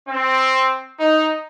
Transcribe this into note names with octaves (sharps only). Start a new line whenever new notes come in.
C4
D#4